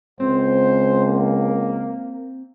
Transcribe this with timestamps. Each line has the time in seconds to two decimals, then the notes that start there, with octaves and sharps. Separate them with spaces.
0.20 C#2 C4 C5
1.06 A#3